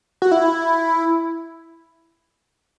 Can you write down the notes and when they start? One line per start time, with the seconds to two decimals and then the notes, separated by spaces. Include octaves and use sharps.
0.22 F#4
0.32 E4